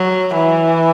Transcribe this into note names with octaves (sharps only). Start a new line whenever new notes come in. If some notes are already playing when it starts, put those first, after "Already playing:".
Already playing: F#3
E3